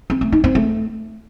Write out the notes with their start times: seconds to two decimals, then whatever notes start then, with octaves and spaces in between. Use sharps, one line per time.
0.10 C4
0.21 A3
0.32 D#4
0.44 C4
0.55 A3